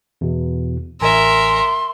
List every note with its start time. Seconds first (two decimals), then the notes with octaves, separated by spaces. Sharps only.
0.21 E2 B2
1.01 A1 A#4 E5 G#5 C6